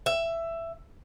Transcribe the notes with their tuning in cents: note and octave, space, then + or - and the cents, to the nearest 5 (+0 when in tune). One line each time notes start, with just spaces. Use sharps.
E5 +15